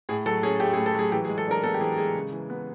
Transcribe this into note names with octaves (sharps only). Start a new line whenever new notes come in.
A2 G#4
F#3 A4
C#4 G#4
A3 G4
G#4
A2
A4
F#3 G#4
E3 G4
G#4
G#3
A4
D4 A#4
B3 A4
G4
E3 G#4
G#3 G#4
C#3
E3
B3